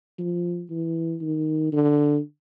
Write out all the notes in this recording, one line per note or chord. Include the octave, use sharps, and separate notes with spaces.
F3
E3
D#3
D3